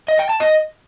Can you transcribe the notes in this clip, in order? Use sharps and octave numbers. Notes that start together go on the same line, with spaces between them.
D#5
G5
A5
D#5